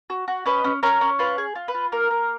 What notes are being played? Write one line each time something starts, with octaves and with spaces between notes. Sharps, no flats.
F#4
F#4
C#4 B4 D#5
C#4
C#4 A#4 C#5
C#4
F4 B4
G#4
F4
B4
F4
A#3 A#4
A#3